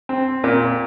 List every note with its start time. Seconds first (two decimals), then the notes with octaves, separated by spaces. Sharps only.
0.09 C4
0.44 A#2